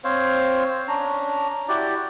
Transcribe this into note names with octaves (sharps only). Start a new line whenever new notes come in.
C4 C5 C#5 F5
C#4 D4 A#5
E4 F#4 G4 D5